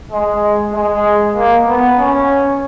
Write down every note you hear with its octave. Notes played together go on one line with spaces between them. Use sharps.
G#3
G#3
A#3
B3
C#4